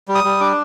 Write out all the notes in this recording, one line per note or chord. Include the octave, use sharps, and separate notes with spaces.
G3
D#6
G3
D4 D6